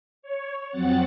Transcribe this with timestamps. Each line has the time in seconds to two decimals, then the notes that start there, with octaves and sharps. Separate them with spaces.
0.22 C#5
0.70 F2 F#3 C4 F#5 A6 C#7